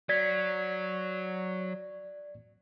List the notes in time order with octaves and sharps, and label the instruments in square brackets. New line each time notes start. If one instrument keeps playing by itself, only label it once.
[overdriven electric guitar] F#3 [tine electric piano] D5 G#6 B6